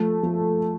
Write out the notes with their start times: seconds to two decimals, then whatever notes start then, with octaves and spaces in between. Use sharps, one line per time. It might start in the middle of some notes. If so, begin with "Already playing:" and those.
Already playing: F3 A3 A4
0.23 F3